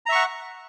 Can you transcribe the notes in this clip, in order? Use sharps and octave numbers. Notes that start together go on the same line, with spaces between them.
E5 F#5 A#5 C#6